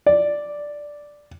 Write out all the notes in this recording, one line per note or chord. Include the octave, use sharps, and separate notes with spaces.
D5